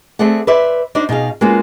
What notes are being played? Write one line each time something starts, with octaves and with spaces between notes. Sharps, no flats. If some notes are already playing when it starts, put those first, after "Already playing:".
A3 C4 G#4 A4 D5 F#5
B4 C5 D5 E5
D4 D#4 F#4 C5 D5
B2 D#4 G#4 F5
G#3 A#3 B3 C#4 F4 F#4